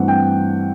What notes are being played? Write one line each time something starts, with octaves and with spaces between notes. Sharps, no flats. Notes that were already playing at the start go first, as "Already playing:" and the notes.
Already playing: G2 E3 A3 C4 F#5
G5